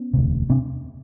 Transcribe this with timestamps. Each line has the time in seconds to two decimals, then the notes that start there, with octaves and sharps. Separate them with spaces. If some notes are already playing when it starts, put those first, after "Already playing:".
Already playing: B3 C#4
0.13 E1 D2 C3
0.50 C3 C4 D4